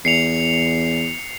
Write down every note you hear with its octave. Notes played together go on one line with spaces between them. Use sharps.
E2 C7 C#7 F7